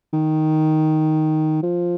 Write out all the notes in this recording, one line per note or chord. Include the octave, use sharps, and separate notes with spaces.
D#3
F3